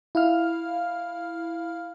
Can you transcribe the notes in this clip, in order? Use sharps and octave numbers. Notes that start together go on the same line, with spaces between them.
E4 F5 F6